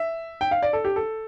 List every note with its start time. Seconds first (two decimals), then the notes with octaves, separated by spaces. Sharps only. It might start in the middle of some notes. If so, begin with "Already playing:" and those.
Already playing: E5
0.41 G5
0.51 F5
0.63 D5
0.73 A4
0.85 G4
0.96 A4